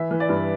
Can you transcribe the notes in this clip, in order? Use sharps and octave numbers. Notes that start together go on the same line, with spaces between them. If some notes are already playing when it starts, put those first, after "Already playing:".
Already playing: E3 E5
E3
D5
G2